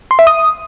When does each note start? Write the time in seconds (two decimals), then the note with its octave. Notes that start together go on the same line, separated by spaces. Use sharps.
0.11 C6
0.19 E5
0.27 D#6